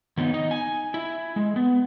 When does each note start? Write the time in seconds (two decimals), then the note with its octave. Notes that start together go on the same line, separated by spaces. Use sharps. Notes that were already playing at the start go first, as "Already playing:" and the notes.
0.17 D#3 B3 D#4
0.34 D#4
0.51 G#5
0.94 E4
1.36 G#3
1.56 B3